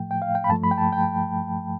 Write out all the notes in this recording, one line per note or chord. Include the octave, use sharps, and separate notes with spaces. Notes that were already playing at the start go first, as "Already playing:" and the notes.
Already playing: A2 F3 A3 G5
G5
F5
G5
B5
G2 F3 A3 A5
B5
G5
A5
G5